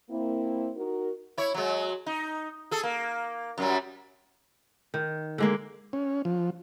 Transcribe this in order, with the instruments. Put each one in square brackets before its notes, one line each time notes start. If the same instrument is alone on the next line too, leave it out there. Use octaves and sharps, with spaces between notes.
[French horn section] A#3 C4 E4
D#4 F#4 A#4
[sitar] E4 C#5
F#3 G#3
D#4
G#4 A4
A#3
F#2 F#3 G3
[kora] D#3
D3 G#3 A#3
[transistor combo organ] C#4
F3